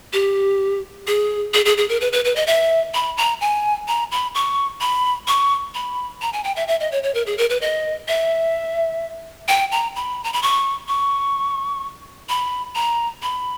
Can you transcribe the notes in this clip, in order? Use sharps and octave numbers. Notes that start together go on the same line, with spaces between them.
G4
G#4
G#4
G#4
G#4
A#4
B4
B4
B4
D#5
E5
B5
A#5
G#5
A#5
B5
C#6
B5
C#6
B5
A#5
G#5
G5
E5
E5
D#5
C#5
C#5
A#4
G#4
A#4
B4
D#5
E5
G5
A#5
B5
A#5
B5
C#6
C#6
B5
A#5
B5